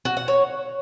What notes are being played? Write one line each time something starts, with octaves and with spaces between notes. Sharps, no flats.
F#4
F#5
C#5